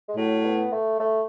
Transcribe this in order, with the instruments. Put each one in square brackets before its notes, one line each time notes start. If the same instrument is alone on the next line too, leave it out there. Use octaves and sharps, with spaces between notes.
[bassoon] G#3
[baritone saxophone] A2 [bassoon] F#3
[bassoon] B3
A3
A3